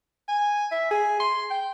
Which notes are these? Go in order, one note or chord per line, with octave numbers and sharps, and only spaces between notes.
G#5
E5
G#4
C6
G5